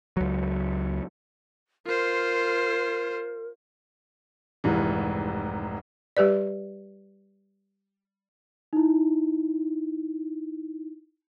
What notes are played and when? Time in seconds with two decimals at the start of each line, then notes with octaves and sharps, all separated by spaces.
0.17 C#2 F#3
1.86 F4 A#4 C5
4.64 F1 C2 G#2 E3
6.17 G3 G4 B4 D5
8.73 D#4 E4